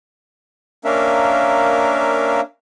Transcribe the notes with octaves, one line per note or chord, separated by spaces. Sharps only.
A#3 C#4 D4 A#4 E5 F5